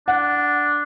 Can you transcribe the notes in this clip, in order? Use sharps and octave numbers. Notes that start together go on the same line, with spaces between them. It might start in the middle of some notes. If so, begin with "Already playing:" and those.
D4 F#5